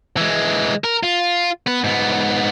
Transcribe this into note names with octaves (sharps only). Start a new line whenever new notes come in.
E3 G#3
A#4
F4
B3 B4
G#2 B3